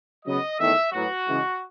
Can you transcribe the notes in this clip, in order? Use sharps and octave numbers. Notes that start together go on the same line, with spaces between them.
C#3 F#3 B3 D#5
E2 D#3 A3 E5
A2 F#3 B3 F#4
C#3 E3 G#3